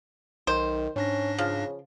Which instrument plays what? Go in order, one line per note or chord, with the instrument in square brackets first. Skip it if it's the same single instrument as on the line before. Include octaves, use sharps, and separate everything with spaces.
[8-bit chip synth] B1 [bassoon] D#3 [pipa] C5
[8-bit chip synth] G#2 D4 A#6 [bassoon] C#4
[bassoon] C#3 [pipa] F3